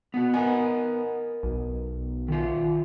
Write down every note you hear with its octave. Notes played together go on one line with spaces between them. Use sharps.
B3 F#4
B3 A#4 D#5 G#5
B1
D#3 F4